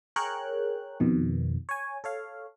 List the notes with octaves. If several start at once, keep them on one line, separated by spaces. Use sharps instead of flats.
G#4 A#4 C#5 G5 F#6
F2 B2 D#3
C#5 G#5
A4 C#5 F5